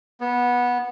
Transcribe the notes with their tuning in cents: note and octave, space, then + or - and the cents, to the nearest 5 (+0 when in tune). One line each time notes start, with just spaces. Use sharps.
B3 -15